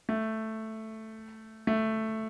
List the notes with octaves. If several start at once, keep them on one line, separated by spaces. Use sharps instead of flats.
A3
A3